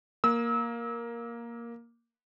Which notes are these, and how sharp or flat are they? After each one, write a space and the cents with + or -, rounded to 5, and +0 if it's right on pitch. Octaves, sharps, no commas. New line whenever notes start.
A#3 +5 E6 -35